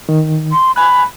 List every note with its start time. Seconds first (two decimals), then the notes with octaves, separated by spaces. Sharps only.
0.09 D#3
0.52 C6
0.76 G#5 B5 F#6